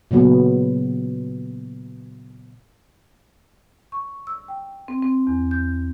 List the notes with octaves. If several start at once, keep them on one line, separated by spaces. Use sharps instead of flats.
A#2 C#3 F#3 B3
C#6
E6
G5
C4
C4
E2
G6